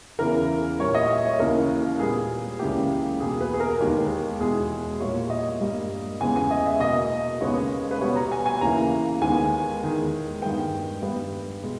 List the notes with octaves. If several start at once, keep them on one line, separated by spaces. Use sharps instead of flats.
E2 C#3 E3 A#4
A#2 G3 A#3 C#5
D#5
E5
C#5
D#2 C#3 E3 A#3 A#4
A#2 G3 B3 G#4
C#2 C#3 E3 A#3 G4
E2 B2 A#3 G#4
B4
G#4
A#4
D#2 D#3 G#3 G4
E2 B2 G#3 G#4
A#2 G3 A#3 C#5
D#5
G2 G3 A#3
E2 C#3 G#3 B3 G#5
G#5
D#5
E5
B2 A#3 D#5
D#2 C#3 G#3 B3 C#5
B4
B2 G3 B3 C#5
A#5
G#5
G#5
D#2 C#3 E3 A#3 A#5
D#2 D#3 G#3 B3 G#5
E2 D#3 G#3
G2 D#3 G#3 B3 G5
G2 G3 B3
B2 G#3